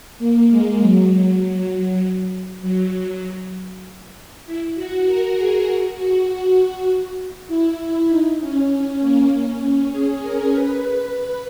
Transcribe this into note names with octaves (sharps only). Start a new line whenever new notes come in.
A#3
G#3
F#3
F#3
E4
F#4
A#4
G#4
F#4
F#4
F#4
E4
E4
D#4
C#4
C#4
A#3
C#4
G#4
A#4
B4